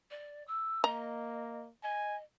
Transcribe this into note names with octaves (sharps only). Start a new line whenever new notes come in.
D5
E6
A#3 D#5 A#5
D#5 G#5